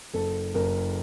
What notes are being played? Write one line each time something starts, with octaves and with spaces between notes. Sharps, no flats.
F#1 A4
F#1 A#4